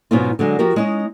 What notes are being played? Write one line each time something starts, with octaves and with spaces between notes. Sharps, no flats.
G#2 B2 F#3 C#4 D#4 F4
D3 F#3 G#3
F3 F#4 G4 A#4
G#3 C#4 D#4